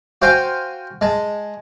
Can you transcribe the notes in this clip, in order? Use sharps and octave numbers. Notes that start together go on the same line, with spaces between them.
F#4 C5 F5 G5 G#5
G#3 A5